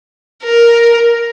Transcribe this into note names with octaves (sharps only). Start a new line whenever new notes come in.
A#4